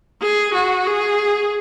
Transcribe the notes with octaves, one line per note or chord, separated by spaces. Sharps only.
G#4
F#4
G#4